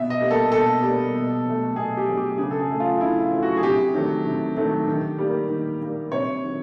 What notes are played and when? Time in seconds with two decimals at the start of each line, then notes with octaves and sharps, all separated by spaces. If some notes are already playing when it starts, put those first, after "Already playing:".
Already playing: B2 E5
0.10 D#5
0.20 G3 A#3
0.31 A4
0.52 B2 A4
0.82 G3 A#3
1.14 B2
1.45 F#3 A3
1.76 B2 G#4
1.97 G4
2.07 F#3 A3
2.17 G4
2.38 C#3 G#4
2.51 A4
2.60 G#4
2.69 F#3 A3
2.80 F4
3.01 C#3 E4
3.21 F4
3.32 F#3 A3
3.43 F#4
3.57 G#4
3.63 C3 G4
3.94 D#3 F#3 A3
4.25 C3
4.56 D#3 F#3 A3
4.88 D#3
5.18 G3 A#3
5.49 D#3
5.81 G3 A#3
6.12 C3 C#5
6.43 D#3 F#3